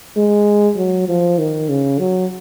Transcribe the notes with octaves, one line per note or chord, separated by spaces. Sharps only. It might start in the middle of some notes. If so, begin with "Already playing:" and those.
G#3
F#3
F3
D#3
C#3
F#3